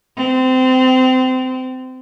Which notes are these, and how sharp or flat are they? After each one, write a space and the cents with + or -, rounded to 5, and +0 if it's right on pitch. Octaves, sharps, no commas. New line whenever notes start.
C4 -25